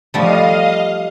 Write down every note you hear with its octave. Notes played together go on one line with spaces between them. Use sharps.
F3 G3 A3 D#5 F5 D#6